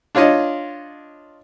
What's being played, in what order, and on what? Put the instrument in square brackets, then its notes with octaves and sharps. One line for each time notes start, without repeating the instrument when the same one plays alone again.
[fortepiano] D4 F4 C#5 D#5